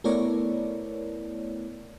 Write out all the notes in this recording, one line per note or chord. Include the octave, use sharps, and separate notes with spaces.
A3 B3 E4 A#4 C#5 D5